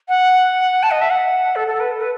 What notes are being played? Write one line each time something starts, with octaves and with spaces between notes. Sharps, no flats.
F#5
A5
D#5
E5
F#5
A4
A4
B4
A4
B4